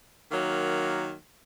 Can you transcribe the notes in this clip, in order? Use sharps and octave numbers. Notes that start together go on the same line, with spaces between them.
D#3 F#3 A#3